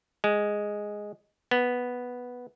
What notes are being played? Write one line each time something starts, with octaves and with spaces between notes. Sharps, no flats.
G#3
B3